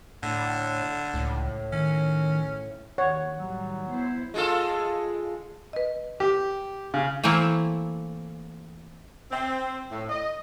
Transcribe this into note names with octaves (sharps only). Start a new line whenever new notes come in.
A2 D3
C#2 A2
D#3 C#4
D#2 C#5 F#5
A2 D#3 F#3 G3
B3 E4 C5
G#3 F4 A4
B4 D#5
G4
C#3
E3 A3 A#3 C4 E4
C4
A2
D#5